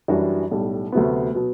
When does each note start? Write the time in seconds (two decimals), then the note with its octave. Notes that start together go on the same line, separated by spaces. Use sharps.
0.08 F#2 E3 G3 D4 F#4
0.51 B1 A2 G3
0.92 D2 C3 F#3 B3
1.34 B2 F#3 B3